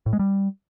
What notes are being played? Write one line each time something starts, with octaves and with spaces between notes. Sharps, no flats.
A2
G#3
G3